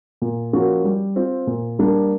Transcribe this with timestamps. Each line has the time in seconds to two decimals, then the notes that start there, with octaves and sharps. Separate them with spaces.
0.22 A#2
0.53 F3 A#3 C#4 F#4
0.84 G3
1.16 C4 F4
1.47 A#2
1.79 G3 A#3 D4